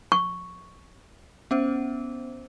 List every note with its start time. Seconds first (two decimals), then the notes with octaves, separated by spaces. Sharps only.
0.12 C#6
1.51 B3 C#4 C5